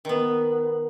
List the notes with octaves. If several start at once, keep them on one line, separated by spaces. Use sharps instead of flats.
D#3 B3